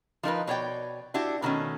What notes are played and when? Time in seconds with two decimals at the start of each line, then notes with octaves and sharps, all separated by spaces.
0.23 F3 D#4 A#4 B4
0.47 B2 C#5 D5 G5
1.14 D4 E4 F#4 G4
1.42 B2 D#3 A3 C#4